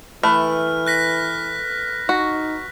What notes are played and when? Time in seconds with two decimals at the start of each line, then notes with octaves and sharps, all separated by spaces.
0.23 E3 A3 B4 F6
0.86 F#6 A#6 B6
2.09 D#4 F#4